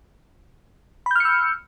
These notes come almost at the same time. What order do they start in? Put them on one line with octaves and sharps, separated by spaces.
B5 G6 F6 C#7 E6